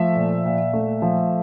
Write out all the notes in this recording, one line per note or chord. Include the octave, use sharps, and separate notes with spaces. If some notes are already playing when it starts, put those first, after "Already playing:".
Already playing: F3 A3 E5
A#2
A#2
A3
F3